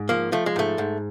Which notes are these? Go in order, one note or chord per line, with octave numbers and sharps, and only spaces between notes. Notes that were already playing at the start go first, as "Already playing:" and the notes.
Already playing: G#2
F3 A#3
F3 A3
G#3
G#2 A3
G#2